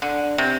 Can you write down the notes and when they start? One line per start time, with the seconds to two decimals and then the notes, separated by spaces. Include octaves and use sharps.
0.02 D3
0.38 C3